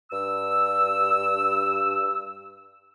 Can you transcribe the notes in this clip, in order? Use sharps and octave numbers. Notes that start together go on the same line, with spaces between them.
G2 E6